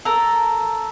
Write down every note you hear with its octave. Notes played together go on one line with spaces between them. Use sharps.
A4 A#4